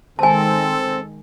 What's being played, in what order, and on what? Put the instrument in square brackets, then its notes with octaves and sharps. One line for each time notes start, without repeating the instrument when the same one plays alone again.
[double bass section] D#3 G#3 [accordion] C4 [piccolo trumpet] A4 [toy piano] G#5 A5